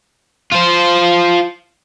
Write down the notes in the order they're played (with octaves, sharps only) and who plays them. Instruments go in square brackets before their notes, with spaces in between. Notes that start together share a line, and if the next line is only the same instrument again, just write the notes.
[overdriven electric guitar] F4 C5